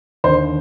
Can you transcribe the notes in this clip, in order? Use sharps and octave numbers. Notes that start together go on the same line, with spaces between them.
D#2 D3 C5